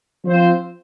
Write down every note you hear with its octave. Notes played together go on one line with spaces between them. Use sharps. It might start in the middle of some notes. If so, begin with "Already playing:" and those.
F3 C4 F4 C5